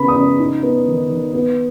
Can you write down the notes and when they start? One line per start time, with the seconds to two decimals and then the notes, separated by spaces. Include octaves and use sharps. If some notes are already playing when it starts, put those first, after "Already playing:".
Already playing: C#3 B3 B5
0.08 D#6
0.16 C#3
0.39 D#4
0.63 B3
0.86 D#3
1.10 D#3
1.33 B3